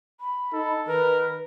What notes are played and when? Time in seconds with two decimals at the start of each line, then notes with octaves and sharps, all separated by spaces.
0.20 B5
0.53 D#4 A4
0.88 D#3 A#4 B4